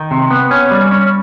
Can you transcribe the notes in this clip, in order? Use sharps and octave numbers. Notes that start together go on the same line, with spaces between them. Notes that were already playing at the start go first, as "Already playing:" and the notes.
Already playing: D#3
C3
B3
C#4
G3
C#4